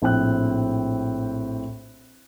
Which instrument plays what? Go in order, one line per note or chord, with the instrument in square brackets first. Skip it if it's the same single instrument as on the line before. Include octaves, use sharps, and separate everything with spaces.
[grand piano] A#1 A2 C4 G5 F#6